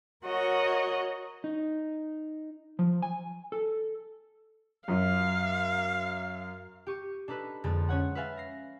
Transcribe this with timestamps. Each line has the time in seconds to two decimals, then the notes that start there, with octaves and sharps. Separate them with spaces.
0.25 F#4 A#4 C#5 D#5 F#5
1.44 D#4
2.79 F3
3.02 G#5
3.52 A4
4.88 F#2 F#3 F5
6.86 G4 C#6 D#7
7.28 D4 D#4 A4 B4
7.64 F2 D3 G#3 A6
7.89 C#4 C#5 F#5
8.15 B4 E5 F5 G#5 A6
8.37 A#6 C7